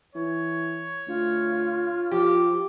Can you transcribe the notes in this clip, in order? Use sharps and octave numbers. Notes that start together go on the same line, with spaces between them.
E3 C#5
D2 F4
F3 G4